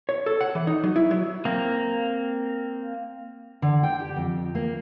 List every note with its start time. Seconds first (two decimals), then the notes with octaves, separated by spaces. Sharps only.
0.09 C#5
0.26 A4
0.41 F#5
0.55 E3
0.67 D#4
0.84 F#3
0.96 E4
1.11 F#3
1.45 A#3 C4
3.62 D3
3.83 G5
4.00 G4
4.16 F2
4.55 A#3